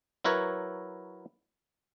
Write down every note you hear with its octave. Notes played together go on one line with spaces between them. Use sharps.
F#3 E4 A#4 B4 C#5 E5